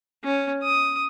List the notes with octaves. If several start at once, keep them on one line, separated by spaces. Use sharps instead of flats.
C#4
D#6